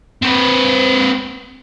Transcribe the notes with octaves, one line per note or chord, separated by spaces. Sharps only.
C4 B4